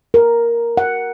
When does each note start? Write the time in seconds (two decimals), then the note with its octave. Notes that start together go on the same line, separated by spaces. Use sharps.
0.14 A#4
0.77 F#5